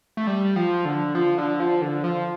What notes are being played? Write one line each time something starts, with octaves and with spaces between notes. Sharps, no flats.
A3
G3
F3
D3
F3
D3
F3
D3
F3